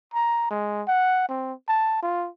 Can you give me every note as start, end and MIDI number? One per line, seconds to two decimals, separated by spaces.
0.14 0.46 82
0.51 0.83 56
0.88 1.27 78
1.29 1.53 60
1.69 1.98 81
2.03 2.29 65